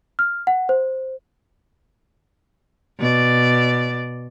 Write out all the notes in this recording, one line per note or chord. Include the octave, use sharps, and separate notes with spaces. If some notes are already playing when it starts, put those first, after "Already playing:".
F6
F#5
C5
B2 D5